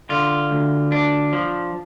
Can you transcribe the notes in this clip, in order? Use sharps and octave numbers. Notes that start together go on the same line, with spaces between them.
D3 F4
D2
D4
F3